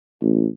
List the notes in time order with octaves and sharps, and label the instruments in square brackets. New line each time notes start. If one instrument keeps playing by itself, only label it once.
[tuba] A1